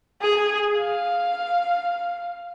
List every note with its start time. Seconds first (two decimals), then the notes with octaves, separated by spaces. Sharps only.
0.21 G#4
0.78 F5